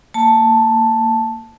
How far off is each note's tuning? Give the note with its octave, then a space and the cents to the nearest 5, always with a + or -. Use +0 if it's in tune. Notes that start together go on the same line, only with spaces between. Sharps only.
A#3 -20 A5 +0